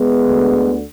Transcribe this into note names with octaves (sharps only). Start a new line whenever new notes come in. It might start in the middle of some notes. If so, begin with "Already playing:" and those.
Already playing: G#3 B3
D2 D3